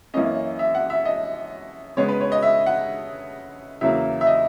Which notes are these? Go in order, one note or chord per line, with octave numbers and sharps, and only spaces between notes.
F#2 E3 A#3 C#4 D#5
E5
F#5
E5
D#5
C#3 G#3 B3 C#5
B4
C#5
D#5
E5
F#5
E2 C#3 F#3 A#3 E5
E5
D#5